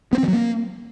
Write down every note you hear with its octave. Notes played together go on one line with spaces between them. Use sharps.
B3
C4
E3
F#3
A#3